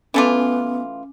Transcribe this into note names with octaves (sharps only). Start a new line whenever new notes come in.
E3 A3 B3 C#4 F4 G#5 D6